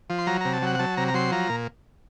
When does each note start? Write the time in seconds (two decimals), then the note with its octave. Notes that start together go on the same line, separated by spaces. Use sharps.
0.10 F3
0.19 C6
0.27 F#3 A#5
0.41 C3 A#5
0.53 A5
0.62 F#3 F#5
0.75 F#5
0.79 F#3 A5
0.97 C3 A#5
1.08 A#5
1.14 F#3 C6
1.32 F3 A#5
1.50 A#2